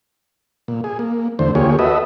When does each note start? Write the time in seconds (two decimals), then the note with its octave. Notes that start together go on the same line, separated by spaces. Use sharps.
0.68 A#2
0.84 G#4
0.99 A#3
1.39 E2 D3 A3 C5
1.55 D2 A#3 F4 G4 G#4 C#5
1.79 F#4 A4 B4 D#5 E5